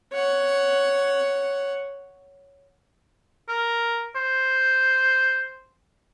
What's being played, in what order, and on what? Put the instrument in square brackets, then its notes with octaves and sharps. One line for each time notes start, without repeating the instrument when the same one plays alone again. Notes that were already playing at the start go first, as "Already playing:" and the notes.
[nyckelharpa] C#5 F#5
[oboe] A#4
C5